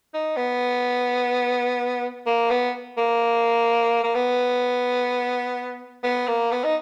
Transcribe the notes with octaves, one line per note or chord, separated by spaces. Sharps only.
D#4
B3
A#3
B3
A#3
A#3
B3
B3
A#3
B3
D#4